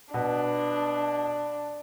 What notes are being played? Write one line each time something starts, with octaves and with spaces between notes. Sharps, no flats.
B2 B3 D4